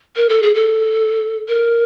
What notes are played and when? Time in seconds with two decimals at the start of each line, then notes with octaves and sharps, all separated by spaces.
0.16 A#4
0.29 A4
0.42 G#4
0.55 A4
1.48 A#4